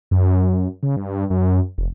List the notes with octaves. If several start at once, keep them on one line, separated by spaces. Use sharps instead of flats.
F#2
C#3
G2
F#2
F1